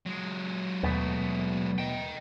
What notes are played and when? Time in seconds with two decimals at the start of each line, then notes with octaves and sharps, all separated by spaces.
0.06 F#3 G#3
0.83 D#2 B2 A3 B3
1.78 D#5 G5